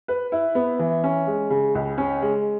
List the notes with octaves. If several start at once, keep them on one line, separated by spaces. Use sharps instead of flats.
B4
E4
B3
E3
C#4
G#3
C#3
C#2
C#4
G#3